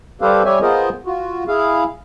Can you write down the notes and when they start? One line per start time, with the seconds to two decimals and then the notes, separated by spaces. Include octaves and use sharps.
0.21 G3 G4 A4 B4 C5 F5
0.45 G3 G4 C#5 E5 G#5
0.62 B3 F4 G#4 A#4 C5 D#5
1.06 F4 F#4
1.48 E4 G#4 F5